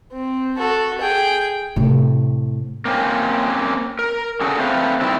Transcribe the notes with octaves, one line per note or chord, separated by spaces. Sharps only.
C4
F#4 A4
G#4 G5
A2 C3
A#3 C4 C#4
A#4
C#4 D4 F#4 G#4 A4
A3 C4 B4 C5 F5
D#3 G3 C4 E4